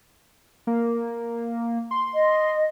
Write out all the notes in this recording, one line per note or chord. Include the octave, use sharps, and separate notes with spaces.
A#3
C6
D#5